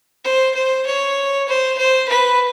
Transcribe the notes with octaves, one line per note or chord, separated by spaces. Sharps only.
C5
C5
C#5
C5
C5
B4